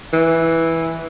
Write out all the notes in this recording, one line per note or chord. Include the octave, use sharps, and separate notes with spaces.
E3